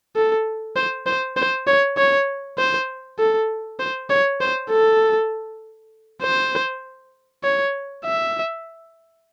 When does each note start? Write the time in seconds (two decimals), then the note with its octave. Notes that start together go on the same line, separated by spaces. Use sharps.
0.16 A4
0.76 C5
1.06 C5
1.37 C5
1.67 C#5
1.97 C#5
2.58 C5
3.19 A4
3.79 C5
4.10 C#5
4.41 C5
4.71 A4
6.22 C5
7.43 C#5
8.05 E5